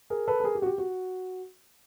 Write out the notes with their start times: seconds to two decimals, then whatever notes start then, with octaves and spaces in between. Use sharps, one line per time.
0.10 G#4 A#4
0.28 A4 B4
0.40 A4
0.44 G#4 A#4
0.55 G4
0.62 F#4
0.66 G4
0.78 F#4